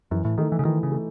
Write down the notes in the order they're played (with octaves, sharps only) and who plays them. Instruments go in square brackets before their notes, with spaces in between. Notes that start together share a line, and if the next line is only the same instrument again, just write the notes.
[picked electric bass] F#2 [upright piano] E3
[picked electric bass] A2
[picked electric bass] D#3 [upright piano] A3 D#4
[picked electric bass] E3
C#3
[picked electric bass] D#3 [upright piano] E3
[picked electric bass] C#3
[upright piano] A3